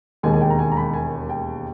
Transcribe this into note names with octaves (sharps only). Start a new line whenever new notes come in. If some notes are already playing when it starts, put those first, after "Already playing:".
E1 D#2 D#3 G#3 G#5
G#5
G5
A#5
G#5
A#5
B5
G#5
G5